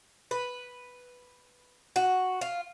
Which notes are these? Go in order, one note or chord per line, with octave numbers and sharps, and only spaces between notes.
B4
F#4
F4